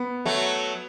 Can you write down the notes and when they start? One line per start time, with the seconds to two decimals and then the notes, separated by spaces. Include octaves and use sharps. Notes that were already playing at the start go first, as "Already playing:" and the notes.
Already playing: B3
0.25 F#3 A3